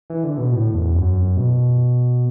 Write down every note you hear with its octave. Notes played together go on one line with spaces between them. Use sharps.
E3
D3
B2
A2
E2
F#2
B2